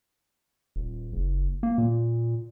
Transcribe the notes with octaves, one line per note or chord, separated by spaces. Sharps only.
D#1
F#1
A#3
A#2